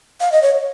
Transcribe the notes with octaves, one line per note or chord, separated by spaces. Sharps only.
F5
D#5
C#5